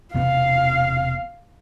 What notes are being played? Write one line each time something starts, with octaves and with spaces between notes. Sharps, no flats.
E1 C3 B3 F5